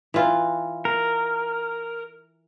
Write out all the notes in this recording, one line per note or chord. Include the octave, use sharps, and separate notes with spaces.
E3 F4
A#4